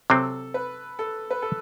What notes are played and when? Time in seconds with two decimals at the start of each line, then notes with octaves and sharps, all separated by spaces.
0.10 C3 F#3 C4 A4
0.54 B4
0.99 A4
1.30 B4
1.42 A4